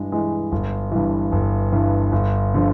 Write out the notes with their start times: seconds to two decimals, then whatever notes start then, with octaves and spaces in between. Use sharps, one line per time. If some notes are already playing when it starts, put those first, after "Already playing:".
Already playing: G2 E3 G#3
0.12 E3 G#3
0.52 G1
0.92 G2 E3
1.32 G1
1.72 G2 E3
2.12 G1
2.54 D3 F3